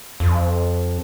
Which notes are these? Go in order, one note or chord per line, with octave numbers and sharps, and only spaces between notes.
F2